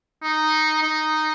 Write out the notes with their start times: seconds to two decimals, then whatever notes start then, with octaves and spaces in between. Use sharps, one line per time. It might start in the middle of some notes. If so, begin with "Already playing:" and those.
0.23 D#4
0.83 D#4